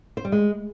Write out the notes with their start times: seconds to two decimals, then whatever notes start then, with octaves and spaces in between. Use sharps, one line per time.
0.17 C5
0.25 G3
0.32 G#3